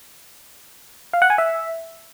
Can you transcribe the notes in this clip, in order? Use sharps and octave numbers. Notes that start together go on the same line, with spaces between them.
F5
F#5
G#5
E5